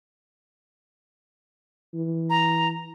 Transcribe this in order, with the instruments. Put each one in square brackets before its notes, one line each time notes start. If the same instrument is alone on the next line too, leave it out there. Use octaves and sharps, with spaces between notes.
[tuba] E3
[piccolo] A#5